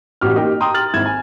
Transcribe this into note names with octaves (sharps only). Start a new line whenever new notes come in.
A1 F#4 G4 F6
A#3 D#4 G4 G5
G5 A#5 C6 D#6
F6 A6 F#7
G#1 E4 G#6 E7
G#5